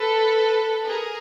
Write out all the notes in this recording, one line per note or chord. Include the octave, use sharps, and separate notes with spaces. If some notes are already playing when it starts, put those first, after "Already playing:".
Already playing: A4 B4
G#4 A#4